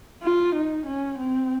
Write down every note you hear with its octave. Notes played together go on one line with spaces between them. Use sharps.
F4
D#4
C#4
C4